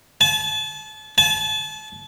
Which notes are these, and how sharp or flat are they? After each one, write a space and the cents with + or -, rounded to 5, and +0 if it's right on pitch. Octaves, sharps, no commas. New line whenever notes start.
A5 -35
A5 -35